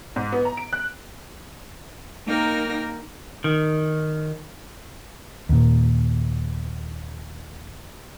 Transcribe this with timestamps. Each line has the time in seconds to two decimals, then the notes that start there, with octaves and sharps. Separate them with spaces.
0.16 G#2
0.32 B3
0.45 A#5
0.57 D7
0.73 F#6
2.26 A#3 D#4 A#4 G5 F6 A#6
3.44 D#3
5.49 D#2 A#2